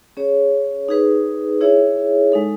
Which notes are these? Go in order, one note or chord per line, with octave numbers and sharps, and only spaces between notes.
C#4 G#4 C#5
D#4 G#4 B4
E4 G#4 C#5 E5
G#3 D#4 A4